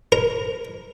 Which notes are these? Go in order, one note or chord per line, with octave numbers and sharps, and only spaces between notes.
A#4